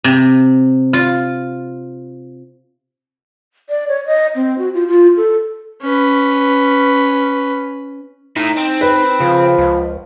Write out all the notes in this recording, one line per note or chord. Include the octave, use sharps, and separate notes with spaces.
C3
F4
D5
C#5
D#5
C4
F#4
F4
F4
A4
C#4 B4
A2 D#4
C4
B4
C#3 F3
C#2